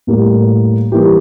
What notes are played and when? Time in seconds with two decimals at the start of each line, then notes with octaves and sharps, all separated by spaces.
0.07 A2 G3 A#3
0.92 E3 G3 A#3 E4 G4